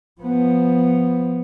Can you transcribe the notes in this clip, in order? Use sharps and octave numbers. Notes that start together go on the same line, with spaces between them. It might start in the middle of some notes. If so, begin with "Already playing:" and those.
F3 B3